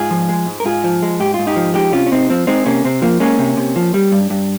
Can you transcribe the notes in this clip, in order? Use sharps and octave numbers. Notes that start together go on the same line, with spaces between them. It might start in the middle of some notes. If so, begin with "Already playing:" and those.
Already playing: G#2 F4 G#4
F3
G#3
G#2
A#4
G#2 F4 G#4
F3
G#3
G#2 G4
G#2 F4
D#4 G4
F3
G#3 D#4 G4
C3 C#4 F4
C#4
C3 C4 D#4
F3 C4
G#3 C4 D#4
C3 A#3 C#4
C3 C4
F3 A#3
G#3 A#3 C#4
C3
C3
F3
G3
G2
G2